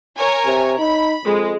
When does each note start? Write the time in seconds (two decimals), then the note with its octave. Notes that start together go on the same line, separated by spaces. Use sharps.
0.17 A#4 C#5 G#5
0.46 C3
0.79 D#4 B5
1.25 F2 G#3